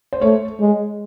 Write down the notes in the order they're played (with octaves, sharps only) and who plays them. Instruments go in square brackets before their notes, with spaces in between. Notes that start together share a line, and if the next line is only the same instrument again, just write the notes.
[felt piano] C5
[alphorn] A3 [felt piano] C#5
[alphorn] G#3